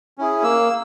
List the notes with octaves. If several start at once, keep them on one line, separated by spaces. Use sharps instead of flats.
C#4 E4 G#4
A#3 E6